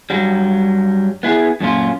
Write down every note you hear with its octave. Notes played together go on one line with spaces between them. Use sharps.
G2 F#3 G3
B3 E4 G#4
F#2 A#2 C#4 F4